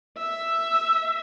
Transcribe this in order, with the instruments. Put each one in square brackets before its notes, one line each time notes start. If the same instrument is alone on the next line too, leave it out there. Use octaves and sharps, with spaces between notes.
[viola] E5